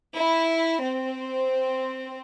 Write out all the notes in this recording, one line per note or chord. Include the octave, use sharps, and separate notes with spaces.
E4
C4